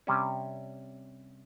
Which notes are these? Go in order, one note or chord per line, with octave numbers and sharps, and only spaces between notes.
C3 G3 C#4